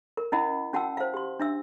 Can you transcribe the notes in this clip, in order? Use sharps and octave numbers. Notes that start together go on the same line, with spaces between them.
A#4
C#4 E4 D#5 F#5 B5
C#4 F#4 F#5 G5 A5 E6
C5 F5
G4 C6
D4 E5 E6